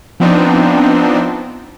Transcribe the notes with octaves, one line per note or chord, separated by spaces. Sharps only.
F3 B3 C4 D4 D#4